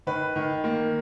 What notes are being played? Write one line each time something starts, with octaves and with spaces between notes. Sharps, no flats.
D#3 B4
D#3
A#3